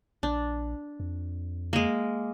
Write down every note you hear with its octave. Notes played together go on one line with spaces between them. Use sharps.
A#1 D4
F2
G#3 A#3